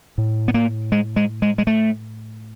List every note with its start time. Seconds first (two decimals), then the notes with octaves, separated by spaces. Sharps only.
0.18 A2
0.48 B3
0.54 A#3
0.92 G#3
1.16 G#3
1.42 G#3
1.58 G#3
1.67 A3